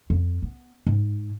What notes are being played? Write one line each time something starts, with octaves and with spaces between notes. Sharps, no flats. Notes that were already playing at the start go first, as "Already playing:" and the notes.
F2
B3
G#2